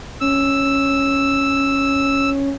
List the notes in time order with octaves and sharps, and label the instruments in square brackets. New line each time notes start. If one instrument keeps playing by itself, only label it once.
[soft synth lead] C#4 [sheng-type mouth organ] E6